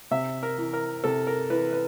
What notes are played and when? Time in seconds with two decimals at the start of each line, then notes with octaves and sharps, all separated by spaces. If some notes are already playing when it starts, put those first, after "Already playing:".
0.11 C3 E5
0.43 A#4
0.58 E3
0.73 A#4
1.04 C3 A4
1.27 A#4
1.50 E3 B4
1.73 B4